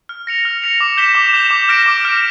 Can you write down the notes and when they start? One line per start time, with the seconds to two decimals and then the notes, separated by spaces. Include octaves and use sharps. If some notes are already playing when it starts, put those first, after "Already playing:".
0.09 F6
0.27 A#6 C#7 F7
0.45 F6
0.62 A#6 C#7 F7
0.80 D6
0.97 G6 B6 E7 G7
1.15 D6
1.34 G6 B6 E7 G7
1.51 D6
1.69 F6 A#6 D7
1.86 D6
2.05 F6 A#6 D7